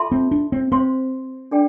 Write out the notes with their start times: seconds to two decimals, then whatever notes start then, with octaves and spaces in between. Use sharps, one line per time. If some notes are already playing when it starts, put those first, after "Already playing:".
Already playing: F4 A4 E5 A5 C6
0.12 C4
0.31 D4
0.52 C4
0.72 C4 C5 F5 C6
1.51 D4 A4 D5 G5